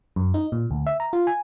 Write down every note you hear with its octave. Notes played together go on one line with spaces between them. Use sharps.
F#2
D#4
A#2
D2
E5
A#5
F4
G#5